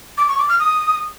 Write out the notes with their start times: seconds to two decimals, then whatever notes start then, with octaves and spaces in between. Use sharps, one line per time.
0.18 D6
0.28 C#6
0.39 D6
0.49 F6
0.59 D#6